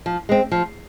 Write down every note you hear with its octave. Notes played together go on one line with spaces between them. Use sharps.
F3
G#3 C4
F3